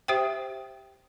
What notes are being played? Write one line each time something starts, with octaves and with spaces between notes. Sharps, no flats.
G4 C5 E5 G5